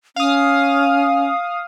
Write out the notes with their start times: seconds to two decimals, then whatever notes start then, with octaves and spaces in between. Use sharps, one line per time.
0.16 C#4 F5 D#6